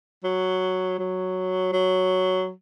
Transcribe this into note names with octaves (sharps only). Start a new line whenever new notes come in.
F#3
F#3
F#3